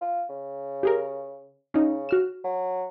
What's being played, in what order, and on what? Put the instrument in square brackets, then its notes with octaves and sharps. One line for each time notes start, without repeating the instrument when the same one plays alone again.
[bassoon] F4
C#3
[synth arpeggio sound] G4 G#4 A#4
[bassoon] C#3 [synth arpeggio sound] C#4 D#4
[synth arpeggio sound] F#4 F6 E7
[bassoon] F#3